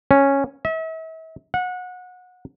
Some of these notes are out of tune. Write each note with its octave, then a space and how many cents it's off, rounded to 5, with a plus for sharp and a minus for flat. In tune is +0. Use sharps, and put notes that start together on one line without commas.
C#4 -5
E5 -40
F#5 -25